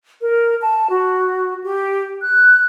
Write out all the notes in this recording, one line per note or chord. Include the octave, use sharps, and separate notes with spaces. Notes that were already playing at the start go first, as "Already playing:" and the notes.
A#4
A5
F#4
G4
F#6